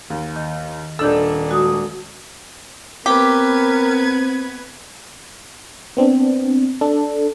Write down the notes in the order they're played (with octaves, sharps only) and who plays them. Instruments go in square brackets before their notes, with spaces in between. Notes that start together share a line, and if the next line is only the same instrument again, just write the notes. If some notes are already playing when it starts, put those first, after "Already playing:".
[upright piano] D#2
[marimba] D#3
[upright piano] D#1 D4 E6 [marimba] D#3 A4
[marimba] G#3 F#4 D#6
[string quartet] B3 B4 G#6 [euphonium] C4 [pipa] G4 [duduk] A#4
[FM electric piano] B3 C4 D4
D4 A4